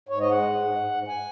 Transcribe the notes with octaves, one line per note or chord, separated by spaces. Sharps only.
G#2 C#5
D#5
G#3 F#5
G#2
G#2
G#2
G#2
G#5